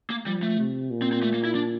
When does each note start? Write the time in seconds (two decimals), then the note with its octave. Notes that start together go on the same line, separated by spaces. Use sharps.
0.10 A#3
0.26 F3 G3
0.43 A3
0.58 C3
0.91 A#2
1.02 C4
1.12 C4
1.23 A3
1.34 A#3
1.45 E4
1.55 D4